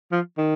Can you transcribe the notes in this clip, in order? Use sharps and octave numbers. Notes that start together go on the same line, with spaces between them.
F3
D#3